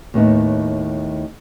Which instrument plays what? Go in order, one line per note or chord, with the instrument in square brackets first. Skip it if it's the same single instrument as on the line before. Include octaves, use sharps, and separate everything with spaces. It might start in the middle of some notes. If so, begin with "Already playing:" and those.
[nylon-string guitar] D#2 A2 B3 D#4